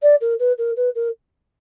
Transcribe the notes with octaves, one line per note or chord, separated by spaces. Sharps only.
D5
A#4
B4
A#4
B4
A#4